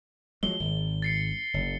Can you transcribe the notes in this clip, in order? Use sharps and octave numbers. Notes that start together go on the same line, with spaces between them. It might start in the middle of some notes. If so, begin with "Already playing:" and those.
F3 F#3 G#3 G7
G#1
A6 C7 C#7
F#1